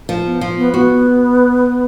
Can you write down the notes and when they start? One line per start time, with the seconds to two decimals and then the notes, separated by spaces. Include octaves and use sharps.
0.09 F3
0.26 B3
0.41 F3
0.57 B3
0.74 B3 F#4